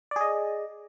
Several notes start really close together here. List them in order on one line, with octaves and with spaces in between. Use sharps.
D5 G#4 D#5